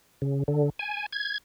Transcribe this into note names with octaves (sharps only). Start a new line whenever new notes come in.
C#3
D3
G#5
G#6